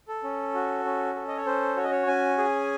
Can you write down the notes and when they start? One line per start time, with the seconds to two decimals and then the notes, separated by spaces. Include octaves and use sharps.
0.08 A4
0.23 C#4
0.54 F#4
0.85 C#4
1.15 A4
1.28 D#5
1.37 C#5
1.46 C#4 C5
1.76 F#4 C#5
1.84 D#5
1.91 C#5
2.07 C#4 G#5
2.38 G#4